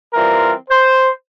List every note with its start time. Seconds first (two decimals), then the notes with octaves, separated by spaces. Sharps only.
0.14 E3 G3 C4 F4 A#4
0.70 C5